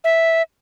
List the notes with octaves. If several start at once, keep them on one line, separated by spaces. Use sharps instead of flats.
E5